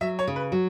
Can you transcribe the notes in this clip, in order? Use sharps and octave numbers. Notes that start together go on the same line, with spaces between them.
F#3 E5
C#5
C#3
B4
F#3